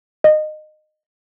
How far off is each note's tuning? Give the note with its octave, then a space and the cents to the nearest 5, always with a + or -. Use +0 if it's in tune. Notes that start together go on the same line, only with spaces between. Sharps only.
D#5 -20